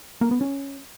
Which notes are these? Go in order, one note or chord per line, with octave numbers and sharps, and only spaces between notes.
A#3
B3
C#4